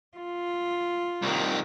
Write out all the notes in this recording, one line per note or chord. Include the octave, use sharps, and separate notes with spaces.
F4
C2 D#3